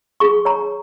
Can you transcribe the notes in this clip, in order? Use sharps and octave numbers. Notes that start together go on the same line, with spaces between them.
G#4 C#6
C#5 A#5